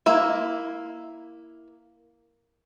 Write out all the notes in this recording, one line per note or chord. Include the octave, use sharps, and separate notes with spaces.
A#3 E4 E5